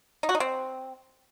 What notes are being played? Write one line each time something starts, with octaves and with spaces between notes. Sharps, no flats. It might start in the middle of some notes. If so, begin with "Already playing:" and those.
D#4
F#4
D#4
C4